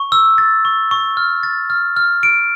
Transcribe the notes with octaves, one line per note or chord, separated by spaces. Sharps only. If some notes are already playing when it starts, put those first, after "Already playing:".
Already playing: C#6
E6
A6
C#6
C#6
F6
A6
F6
F6
D7